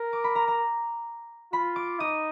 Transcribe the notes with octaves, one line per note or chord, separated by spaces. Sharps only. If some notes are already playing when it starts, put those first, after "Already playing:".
Already playing: A#4
D6
B5
A#5
A#5
F4 B5
D6
D#4 D#6